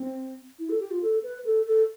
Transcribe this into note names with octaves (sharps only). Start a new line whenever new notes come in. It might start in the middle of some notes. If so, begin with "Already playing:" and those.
Already playing: C4
E4
A4
G4
F4
A4
B4
A4
A4